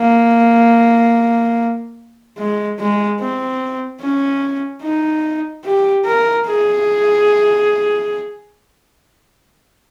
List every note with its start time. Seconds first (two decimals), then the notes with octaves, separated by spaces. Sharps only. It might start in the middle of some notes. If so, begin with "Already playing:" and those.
Already playing: A#3
2.38 G#3
2.79 G#3
3.20 C4
4.01 C#4
4.82 D#4
5.64 G4
6.05 A#4
6.46 G#4